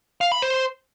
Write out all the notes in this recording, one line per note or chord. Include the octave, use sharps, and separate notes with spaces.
F5
B5
C5